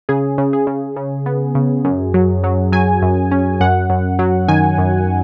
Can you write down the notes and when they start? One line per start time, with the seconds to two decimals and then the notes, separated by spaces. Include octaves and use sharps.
0.09 C#3 G#4
0.38 C#3
0.53 G#4
0.67 C#3
0.96 C#3
1.26 B3
1.55 C#3
1.85 F#2
2.14 F#3
2.44 F#3
2.72 F#3 G#5
3.02 F#2
3.31 C#4
3.60 F#2 F#5
3.90 F#2
4.19 F#3
4.48 D#3 G#5
4.78 F#2